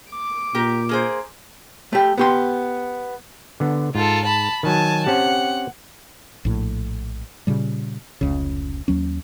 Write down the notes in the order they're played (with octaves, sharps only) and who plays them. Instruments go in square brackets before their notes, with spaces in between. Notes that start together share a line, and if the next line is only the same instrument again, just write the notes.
[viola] D6
[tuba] A#2 [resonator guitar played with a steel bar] G4 A#4
[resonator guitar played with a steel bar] A#3 G#4 C5
[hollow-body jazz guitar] A3 G4
B3 G4 C6
[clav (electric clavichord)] D3 B3
[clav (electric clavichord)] G#2 [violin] F4 A4
[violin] A5 B5
[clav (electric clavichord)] D#3 F#3 [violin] G#5 A5
[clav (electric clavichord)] C4 C#4 G4 [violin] F#5
[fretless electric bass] A#1 A2
A#2 C#3 G3
F1 C#2 C#3
D#2 F#3 C#4